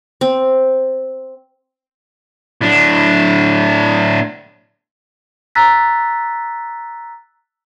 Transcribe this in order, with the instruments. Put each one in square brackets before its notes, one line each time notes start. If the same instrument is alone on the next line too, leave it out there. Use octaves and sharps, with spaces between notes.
[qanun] C4
[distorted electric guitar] A2 D4
[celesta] A#5 E6 F#6 A6 B6